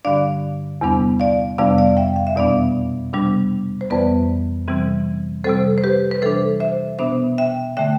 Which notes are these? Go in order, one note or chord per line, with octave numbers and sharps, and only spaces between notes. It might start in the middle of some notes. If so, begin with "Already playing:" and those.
G2 D3 G3 D4 D5 F5
E2 C3 G3 B3 D4
D5 F5
F2 C3 G3 B3 D4 D5 F5
D5 F5
E5 G5
F5
E5
E2 B2 G3 B3 D4 D5 F5
C3 G3 B3 D4
C5
F2 E3 G3 B3 B4 D5
C3 E3 G3 C4
C3 G3 C4 A4 C5
C5
G4 B4
B4
C3 E3 G3 D4 A4 C5
C5 E5
B2 B3 D4 C5 E5
E5 G5
D3 A3 E5 G5